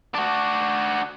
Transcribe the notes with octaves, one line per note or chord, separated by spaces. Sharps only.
D4 F#4